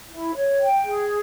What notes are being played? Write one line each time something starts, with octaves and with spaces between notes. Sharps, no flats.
E4
C#5
G5
G#4